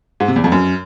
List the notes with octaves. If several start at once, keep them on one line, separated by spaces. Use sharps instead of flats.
G#2
C3
E2
F2
F#2